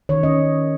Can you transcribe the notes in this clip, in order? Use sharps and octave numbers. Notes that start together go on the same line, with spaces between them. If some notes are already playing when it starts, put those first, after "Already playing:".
D#3 C#5
C#4 D#5